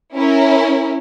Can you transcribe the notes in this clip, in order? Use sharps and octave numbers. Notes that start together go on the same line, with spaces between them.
C#4 E4 A#4